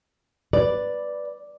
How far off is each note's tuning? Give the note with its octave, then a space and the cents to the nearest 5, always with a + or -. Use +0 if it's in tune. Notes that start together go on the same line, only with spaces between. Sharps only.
B4 +0 D5 +0